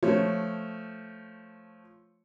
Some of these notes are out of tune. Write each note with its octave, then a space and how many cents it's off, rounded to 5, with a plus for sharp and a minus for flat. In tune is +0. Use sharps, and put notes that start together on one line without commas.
F3 +0 A3 +0 C#5 +0